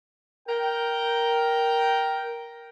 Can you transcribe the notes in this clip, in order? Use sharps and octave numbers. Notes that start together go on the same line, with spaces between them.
A#4 G5